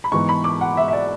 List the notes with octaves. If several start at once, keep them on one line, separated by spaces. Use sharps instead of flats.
B5
G#2 E3 B3 C#6
B5
D6
F#5
E5
E5
D5